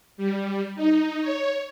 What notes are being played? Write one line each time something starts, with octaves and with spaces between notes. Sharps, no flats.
G3
D#4
C#5